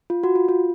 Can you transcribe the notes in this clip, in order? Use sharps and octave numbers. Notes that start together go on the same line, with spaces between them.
F4
F#4
F4
F4